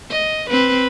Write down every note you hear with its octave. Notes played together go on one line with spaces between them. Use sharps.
D#5
C4 B4